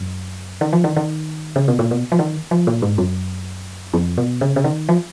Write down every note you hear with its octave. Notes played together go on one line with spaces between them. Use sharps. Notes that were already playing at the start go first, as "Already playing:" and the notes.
Already playing: F#2
D#3
F3
D#3
D#3
C#3
B2
A#2
B2
F3
D#3
F3
A#2
G#2
F#2
F2
B2
C#3
C#3
D#3
F3